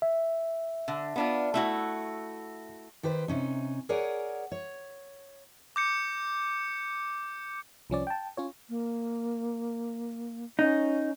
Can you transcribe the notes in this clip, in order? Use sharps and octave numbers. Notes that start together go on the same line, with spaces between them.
E5
D3
B3 D4 F4
A3 E4 F#4
D#3 G4 B4 C5
C3 C#4 D#4
G#4 A#4 C#5 D5 F#5 G#5
C#5
D6 G6 C#7
C2 F3 C#4 D5
G5 A5
C#4 F4 C#5
A#3
C#4 D#4